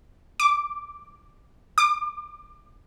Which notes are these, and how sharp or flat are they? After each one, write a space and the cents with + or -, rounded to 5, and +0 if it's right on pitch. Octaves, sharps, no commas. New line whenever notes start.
D6 -5
D6 +40